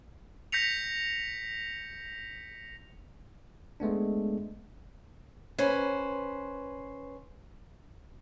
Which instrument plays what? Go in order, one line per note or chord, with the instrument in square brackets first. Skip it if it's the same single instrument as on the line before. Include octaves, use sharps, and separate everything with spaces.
[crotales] G6 A#6 B6 C#7 F7
[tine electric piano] G#3 A3 B3 D4
[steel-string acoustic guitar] C#4 B4 C5